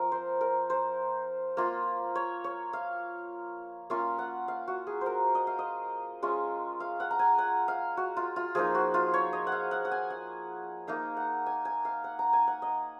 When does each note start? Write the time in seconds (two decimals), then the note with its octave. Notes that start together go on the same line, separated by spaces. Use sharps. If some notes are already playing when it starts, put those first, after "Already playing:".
Already playing: F3 C4 A#4
0.12 C5
0.41 A#4
0.70 C5
1.57 A#3 F4
2.15 C#5
2.44 C#5
2.73 F5
3.90 A#3 C#4 F4 F5
4.19 F#5
4.48 F5
4.68 F#4
4.87 G#4
5.01 A#4 C5
5.35 D#5
5.47 F5
5.59 D#5
6.22 G#3 C#4 F4
6.80 F5
7.00 F#5
7.11 A#5
7.19 G#5
7.38 F#5
7.68 F5
7.97 F#4
8.17 F4
8.36 F4
8.55 F3 A#3 D#4 G#4
8.75 F#4
8.94 F4
9.14 C#5
9.33 D#5
9.47 F#5
9.52 F5
9.71 F#5
9.85 F#5
9.92 G#5
10.10 F#5
10.88 A#3 D#4 F5
11.17 F#5
11.46 G#5
11.65 G#5
11.85 F5
12.04 F#5
12.19 A#5
12.33 G#5
12.47 F#5
12.62 D#5